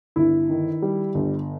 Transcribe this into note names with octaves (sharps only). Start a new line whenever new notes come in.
G1 E4
D#3
G3
G1